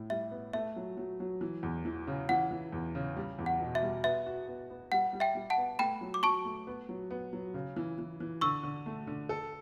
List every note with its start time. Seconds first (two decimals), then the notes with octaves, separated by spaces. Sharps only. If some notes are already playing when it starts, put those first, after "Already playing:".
Already playing: A2
0.10 G3 E5
0.31 B3
0.53 A3 E5
0.76 F#3
0.97 F#3
1.20 F#3
1.41 E3
1.63 E2
1.85 E3
2.07 C#3
2.29 E3 F#5
2.51 E3
2.73 E2
2.95 C#3
3.17 G3
3.39 E2
3.46 F#5
3.60 B2
3.75 E5
3.82 G3
4.04 B3 E5
4.26 F#4
4.48 B3
4.70 B3
4.92 G3 F#5
5.13 G3
5.20 E5 G5
5.35 G3
5.50 F#5 A5
5.57 B3
5.79 A3 G5 B5
6.01 F#3
6.14 D6
6.23 F#3 A5 C#6
6.45 A3
6.67 B3
6.89 F#3
7.11 B3
7.33 F#3
7.54 C#3
7.76 E3
7.98 E3
8.20 E3
8.41 D3 C#6 E6
8.63 D3
8.86 A3
9.07 D3
9.29 A4